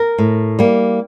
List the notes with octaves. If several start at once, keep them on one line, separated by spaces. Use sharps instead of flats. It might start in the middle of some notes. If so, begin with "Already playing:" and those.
Already playing: A#4
A2
G3 A#3